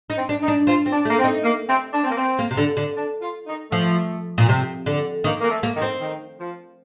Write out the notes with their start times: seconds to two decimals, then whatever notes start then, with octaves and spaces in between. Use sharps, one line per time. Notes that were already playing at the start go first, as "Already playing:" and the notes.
0.10 D#4
0.16 C4
0.29 D4
0.42 D#4
0.48 D4
0.67 C4 F4
0.86 C4
0.92 D4
1.05 A3
1.10 A#3
1.18 C4
1.24 D#4
1.43 A#3
1.68 C4
1.94 D4
2.02 C4
2.10 A#3
2.18 C4
2.39 A#3
2.51 C3
2.57 D3
2.77 D3
2.95 D4
3.21 F4
3.47 D#4
3.71 F3 A3
4.38 A#2
4.49 C3
4.86 D3
5.24 D#3 A#3
5.40 A#3
5.50 A3
5.63 A#3
5.75 D#3
5.82 C4
6.01 D#3
6.39 F3